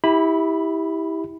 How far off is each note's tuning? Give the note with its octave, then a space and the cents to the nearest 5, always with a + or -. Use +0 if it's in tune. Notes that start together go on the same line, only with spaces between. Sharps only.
E4 -25 G4 +5 B5 +5